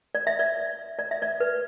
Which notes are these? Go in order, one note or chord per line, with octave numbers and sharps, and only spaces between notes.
D5
E5
D5
D5
E5
D5
B4